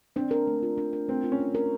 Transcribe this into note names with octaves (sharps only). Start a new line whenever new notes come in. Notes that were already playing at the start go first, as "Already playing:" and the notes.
C4 D4
A#4
A3
F4
D4
A#4
A3 C4
F4
C#4
D4
A#4